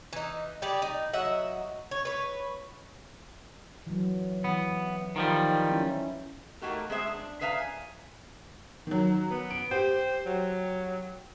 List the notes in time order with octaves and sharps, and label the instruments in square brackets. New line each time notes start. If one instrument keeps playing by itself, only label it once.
[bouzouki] E3 D#4
G3 G4 G#4 D5
D#4
F#3 D#5 E5 F#5
C#5
B4 C#5
[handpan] E3 F#3
[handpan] E3 [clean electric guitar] B3
[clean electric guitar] D#3 F3 G3
[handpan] C#4 E4
[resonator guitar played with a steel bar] A3 A#3 D#4 F#4 G4 A#4
G#3 B3 C4 G#4 C5 E5
D4
G#4 B4 E5 F5 A5 A#5
G#5
[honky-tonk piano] D#3 F#3
[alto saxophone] B3
[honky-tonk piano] D7
[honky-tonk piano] G4 [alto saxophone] C5
[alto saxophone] F#3